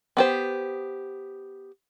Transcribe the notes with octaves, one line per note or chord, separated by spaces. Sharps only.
B3 G4 C5